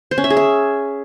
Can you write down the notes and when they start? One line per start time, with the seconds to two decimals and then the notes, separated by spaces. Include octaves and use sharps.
0.11 C5
0.18 C#4
0.24 E5
0.30 G#4
0.37 E5